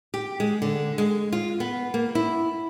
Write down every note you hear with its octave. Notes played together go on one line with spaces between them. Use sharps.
G4
G#3
D3
G#3
F4
B3
A#3
E4